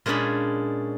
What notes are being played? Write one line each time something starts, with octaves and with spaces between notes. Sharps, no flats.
A#2 G#3 C#4 D4 G#4 B5